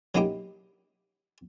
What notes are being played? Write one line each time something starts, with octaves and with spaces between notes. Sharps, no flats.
F#3 A#3 D#4 E4 G4